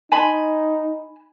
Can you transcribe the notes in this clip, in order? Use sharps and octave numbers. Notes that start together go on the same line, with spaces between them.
D#4 G#5 B5 C6